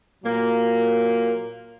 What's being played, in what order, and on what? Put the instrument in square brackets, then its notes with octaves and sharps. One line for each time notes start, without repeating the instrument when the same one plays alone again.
[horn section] A#2 F#3 A#3